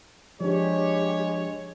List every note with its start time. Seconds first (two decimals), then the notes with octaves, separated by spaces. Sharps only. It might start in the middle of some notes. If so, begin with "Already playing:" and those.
0.41 F3 G#3 D4 G4 C#5